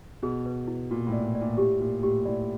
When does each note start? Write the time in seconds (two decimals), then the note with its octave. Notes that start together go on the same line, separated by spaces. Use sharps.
0.22 B2 G#4
0.46 B4
0.67 E4
0.91 A#2 F4
1.07 A2
1.13 D5
1.24 A#2
1.35 D5
1.41 A#2
1.58 A2 G4
1.80 A#2 G4
2.03 A2 G4
2.26 A2 D5